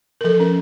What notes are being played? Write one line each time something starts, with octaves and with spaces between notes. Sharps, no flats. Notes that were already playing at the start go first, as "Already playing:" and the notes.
A#4
F3 A4
C#4 A#4